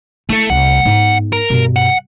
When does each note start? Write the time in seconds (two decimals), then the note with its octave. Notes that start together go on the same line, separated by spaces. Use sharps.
0.29 A3 E4 A4
0.50 C2 A3 F#5
0.85 G#2 B3
1.33 A#4
1.50 G2 B2
1.76 F#5